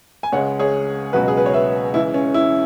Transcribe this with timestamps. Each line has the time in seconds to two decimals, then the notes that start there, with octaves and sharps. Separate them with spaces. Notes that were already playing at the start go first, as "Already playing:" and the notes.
0.23 G#5
0.32 C#2 C#3 G#3 C#5 F#5
0.59 G#4 C#5
1.13 C#2 B2 F#3 F#4 B4
1.28 G#4
1.37 B4
1.46 C#5
1.53 B4 E5
1.94 C#2 C#3 E3 E4
2.14 C#4
2.34 E4